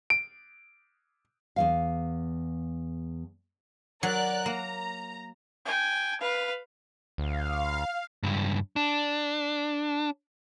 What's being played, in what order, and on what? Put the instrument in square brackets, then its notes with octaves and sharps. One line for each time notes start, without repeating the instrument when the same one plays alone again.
[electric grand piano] D7
[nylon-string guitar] E2 E3 F5
[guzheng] F#3 [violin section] A#4 D5 F#6
[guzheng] A#3 [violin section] A#5
[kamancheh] G5 G#5
B4 F5
[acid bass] D2 [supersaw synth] F5
[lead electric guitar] C#2 G2
D4